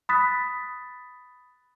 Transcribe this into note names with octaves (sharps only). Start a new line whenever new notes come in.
B5 D#6 F#6 A6 B6